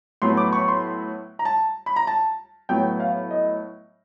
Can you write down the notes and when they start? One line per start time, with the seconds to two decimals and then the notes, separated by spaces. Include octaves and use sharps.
0.22 A2 F#3 B3 C6
0.37 D6
0.53 C#6
0.68 C6
1.39 A#5
1.45 A5
1.86 B5
1.96 A#5
2.07 A5
2.69 A2 F#3 B3 G5
3.00 F5
3.31 D#5